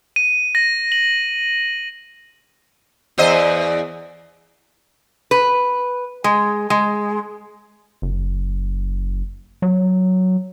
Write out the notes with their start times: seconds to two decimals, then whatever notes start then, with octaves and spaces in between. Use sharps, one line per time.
0.16 D#7
0.55 A#6
0.92 F#7
3.18 E2 C5 D#5
5.31 B4
6.24 G#3
6.70 G#3
8.02 F#1
9.62 F#3